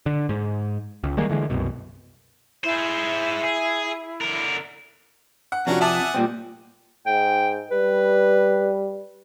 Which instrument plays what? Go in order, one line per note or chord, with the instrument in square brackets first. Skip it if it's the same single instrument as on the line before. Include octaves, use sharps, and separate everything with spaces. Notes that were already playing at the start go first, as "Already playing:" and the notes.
[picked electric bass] D3
G#2
C#2
D#3 G3 G#3 A#3
D3 E3 G#3
C2 F#2 B2
[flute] E4 [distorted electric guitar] G#4 C5
[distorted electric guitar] G#4
D3 A#4
[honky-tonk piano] F#5
[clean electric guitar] F2 C3 [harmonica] C#4 A#5 [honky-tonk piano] D4 F#4
[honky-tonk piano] E5 A5 D6 [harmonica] F#5 G#5 D#6
[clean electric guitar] A#2 G3 C4
[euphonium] G#2 [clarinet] G5
[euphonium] G3 [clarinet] B4